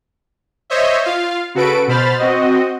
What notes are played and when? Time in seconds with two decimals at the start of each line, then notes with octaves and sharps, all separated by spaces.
0.70 C5 C#5 D#5 E5
1.05 F4 F5
1.55 C#3 F#4 A4 B4 D7
1.88 B2 C5 B5 F6 A6
2.19 C4 F#4 D#5